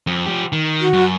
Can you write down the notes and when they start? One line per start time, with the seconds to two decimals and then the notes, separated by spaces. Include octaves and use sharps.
0.07 F2
0.26 F3 G4
0.52 D#3
0.80 F#4
0.93 F#2